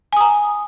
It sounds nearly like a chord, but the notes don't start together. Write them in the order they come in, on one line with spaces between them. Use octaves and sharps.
G#5 D#6 A#5